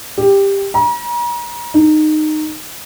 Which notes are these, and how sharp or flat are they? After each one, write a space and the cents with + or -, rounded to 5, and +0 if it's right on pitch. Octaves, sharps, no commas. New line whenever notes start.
G4 +10
A#5 +40
D#4 -15